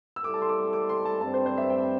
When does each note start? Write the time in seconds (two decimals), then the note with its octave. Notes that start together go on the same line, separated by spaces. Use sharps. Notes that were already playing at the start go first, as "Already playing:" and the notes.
0.16 E6
0.24 G3 E4 A4 D6
0.34 A5
0.42 C6
0.49 D6
0.73 D6
0.89 C6
1.05 A5
1.21 G2 G3 C4 A5
1.34 C5
1.46 C5
1.58 E5
1.70 G5